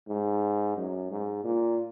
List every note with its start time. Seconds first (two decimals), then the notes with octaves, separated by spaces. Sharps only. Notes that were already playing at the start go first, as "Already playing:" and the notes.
0.08 G#2
0.76 F#2
1.11 G#2
1.44 A#2